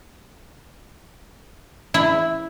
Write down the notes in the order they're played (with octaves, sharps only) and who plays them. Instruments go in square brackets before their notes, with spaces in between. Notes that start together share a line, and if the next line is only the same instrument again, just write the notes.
[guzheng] E4